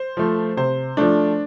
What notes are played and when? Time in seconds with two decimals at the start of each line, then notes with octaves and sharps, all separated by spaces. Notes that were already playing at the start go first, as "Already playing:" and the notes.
Already playing: C5
0.17 F3 A3
0.57 C3 C5
0.97 F3 A3 D4